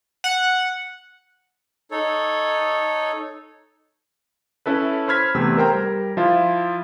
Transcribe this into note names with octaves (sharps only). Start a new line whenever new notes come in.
F#5
D#4 A4 C#5
C#4 E4 A4 B4
C5 B5 F6 G#6 B6
E2 C3 A3 B4 E6
A#4 C5 G5 A#5
G3 A#4
F3 E4 F4